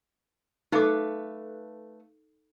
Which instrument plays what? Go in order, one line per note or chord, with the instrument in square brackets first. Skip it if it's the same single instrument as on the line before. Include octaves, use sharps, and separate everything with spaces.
[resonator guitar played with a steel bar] A3 B4 F5 [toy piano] D#4 A4 D6